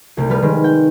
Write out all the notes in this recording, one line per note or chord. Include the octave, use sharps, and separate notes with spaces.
C2 C3 A3
G3 B3 B4 F6
D#3 G#3
G5